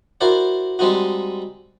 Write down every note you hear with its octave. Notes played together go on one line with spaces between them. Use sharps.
E4 F#4 A#4 C5 D5
G3 G#3 C4 D#4 F#4